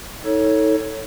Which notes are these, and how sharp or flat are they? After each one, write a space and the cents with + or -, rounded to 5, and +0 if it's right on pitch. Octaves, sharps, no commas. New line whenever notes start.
D#4 +35 A4 +10 C#5 +0